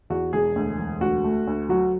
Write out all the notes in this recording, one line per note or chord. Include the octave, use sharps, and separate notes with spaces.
E2 F#4
E1 G#4
D2
E1
D2 F#4
A3
D2
F#3 F#4